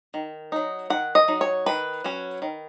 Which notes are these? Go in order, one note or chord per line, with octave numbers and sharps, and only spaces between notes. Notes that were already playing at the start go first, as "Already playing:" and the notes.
D#3
F#3 D#4
D#3 F#5
D#5
F#3 D#4
C#5
D#3 B4
F#3 C#4
D#3